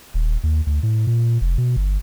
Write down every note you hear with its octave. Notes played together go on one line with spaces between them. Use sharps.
D#1
D#2
D2
A2
A#2
F1
B2
G1